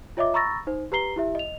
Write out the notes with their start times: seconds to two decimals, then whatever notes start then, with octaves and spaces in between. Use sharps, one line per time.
0.17 F4 C#5 D#5 E5 D6
0.34 A#5 B5 C#6 E6 A6 A#6
0.67 D#4 C5
0.92 G4 B4 A#5 C7 G7
1.16 E4 G4 E5
1.35 D#5 F7